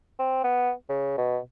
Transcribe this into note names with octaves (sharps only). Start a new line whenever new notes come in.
C4
B3
C#3
B2